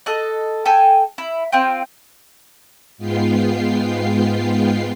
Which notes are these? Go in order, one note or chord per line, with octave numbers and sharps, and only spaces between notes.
A4 D#5 F#6
A4 G5 G#5
E4
C4 F4 G5
G#2 G#3 B3 F4 G5 C7